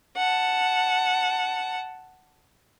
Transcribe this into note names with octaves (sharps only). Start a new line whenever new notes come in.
F#5 A5